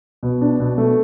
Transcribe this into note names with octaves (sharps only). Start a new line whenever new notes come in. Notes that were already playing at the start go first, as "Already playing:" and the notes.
B2
D4
B2
A3